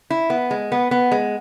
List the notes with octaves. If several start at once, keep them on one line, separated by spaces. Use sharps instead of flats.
E4
B3
G#3
B3
B3
G#3